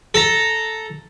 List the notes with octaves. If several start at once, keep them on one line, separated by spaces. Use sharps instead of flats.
A4 A#5